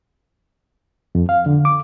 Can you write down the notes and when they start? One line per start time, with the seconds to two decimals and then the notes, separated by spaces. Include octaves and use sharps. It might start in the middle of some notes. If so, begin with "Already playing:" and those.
1.15 F2
1.29 F5
1.46 D3
1.65 D6